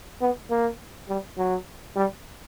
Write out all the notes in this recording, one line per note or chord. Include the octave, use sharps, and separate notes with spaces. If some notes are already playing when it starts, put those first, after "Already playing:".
B3
A#3
G3
F#3
G3